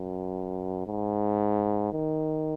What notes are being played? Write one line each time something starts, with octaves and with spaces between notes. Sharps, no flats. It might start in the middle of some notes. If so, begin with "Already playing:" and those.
Already playing: F#2
G#2
D#3